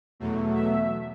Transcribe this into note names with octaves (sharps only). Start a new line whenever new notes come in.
E2 B2 F#3 A3
E5